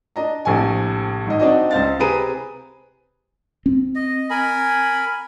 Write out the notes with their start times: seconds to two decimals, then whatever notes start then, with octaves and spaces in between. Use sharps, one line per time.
0.16 D4 D#5 A#5
0.45 A#1 A2 C3 G#5
1.27 G#1 D#5
1.39 C4 D4 D#4 F#4 D#5
1.71 C#2 C5 F5 A6
1.99 C3 C4 G#4 B4 A#5 D#7
3.66 C4
3.95 D#5
4.30 A#4 G#5 B5